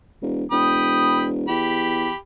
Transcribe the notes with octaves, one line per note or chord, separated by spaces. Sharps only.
E1
E1 G5 B5 D#6
E2 G4 B5